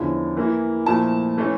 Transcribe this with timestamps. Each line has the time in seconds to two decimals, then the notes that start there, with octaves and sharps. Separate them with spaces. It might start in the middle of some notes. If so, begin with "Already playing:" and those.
Already playing: E2 D3 F3 C#4 E4
0.37 E3 A#3 E4
0.86 A#2 F3 A3 E4 A5
1.38 E3 A3 C#4